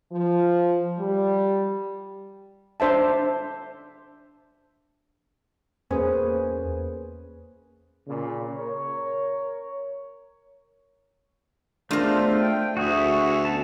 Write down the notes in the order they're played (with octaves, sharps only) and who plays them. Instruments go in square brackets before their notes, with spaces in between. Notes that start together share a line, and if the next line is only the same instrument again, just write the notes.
[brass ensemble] F3
G3
[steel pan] D4 C5 E5 A5
[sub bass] E2 [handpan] A#3 B4 C5 [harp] C#4 G#4
[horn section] A#2 C#3
A#4 C#5
[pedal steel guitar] A3 F4 [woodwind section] B3 G#4 C5 [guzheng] D4 A#4
[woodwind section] G5
[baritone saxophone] D2 [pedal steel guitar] F#4 G#4 [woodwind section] E5
[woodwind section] B3 C#4 D4 [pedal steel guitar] A5